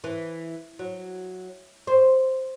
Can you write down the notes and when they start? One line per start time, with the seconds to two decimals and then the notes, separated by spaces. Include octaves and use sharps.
0.04 E3
0.79 F#3
1.87 C5